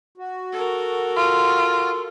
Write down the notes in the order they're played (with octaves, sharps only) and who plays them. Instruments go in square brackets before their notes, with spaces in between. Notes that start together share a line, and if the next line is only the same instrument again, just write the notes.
[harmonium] F#4
[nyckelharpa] A4 A#4
[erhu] F4